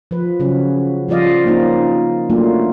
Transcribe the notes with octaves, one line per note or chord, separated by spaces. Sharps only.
F3 B4
C#3 F#3 C#4
F3 G3 F4 D5 D#5 F5
A#3 C4 C#4 D#4 F4
F#3 A3 A#3 D4 F4